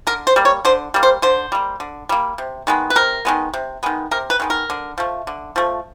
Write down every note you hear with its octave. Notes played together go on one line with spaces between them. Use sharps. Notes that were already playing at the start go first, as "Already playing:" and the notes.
D3 A#4
C5
G3 A#3
C#5
D3 C5
G3 A#3
C5
D3 C5
G3 A#3
D3
G3 A#3
C3
D#3 G#3 B3
B4
C3 A#4
D#3 G#3 B3
C3
D#3 G#3 B3
C3 A#4
B4
D#3 G#3 B3
A#4
D3
F3 A3
D3
F3 A3